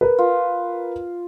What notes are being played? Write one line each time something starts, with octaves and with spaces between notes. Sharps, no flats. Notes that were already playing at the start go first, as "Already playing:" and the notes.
A#4 B4
F4